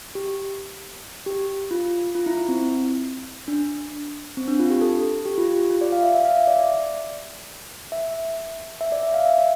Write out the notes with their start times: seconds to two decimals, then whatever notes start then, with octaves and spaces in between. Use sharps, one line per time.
0.15 G4
1.26 G4
1.71 F4
2.15 F4
2.26 E4
2.37 E4
2.48 C4
3.48 D4
4.37 C4
4.48 D4
4.59 F4
4.70 G4
4.81 A4
5.26 G4
5.38 F4
5.48 G4
5.70 F4
5.81 D5
5.92 F5
6.03 E5
6.14 E5
6.25 F5
6.37 E5
6.47 D5
6.59 D5
7.92 E5
8.81 E5
8.92 D5
9.03 E5
9.14 F5
9.25 E5